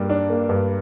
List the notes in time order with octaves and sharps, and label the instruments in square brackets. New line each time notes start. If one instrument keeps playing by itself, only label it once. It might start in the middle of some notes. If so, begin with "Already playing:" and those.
Already playing: [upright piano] G2 G3 A#3
D4
A#3
G2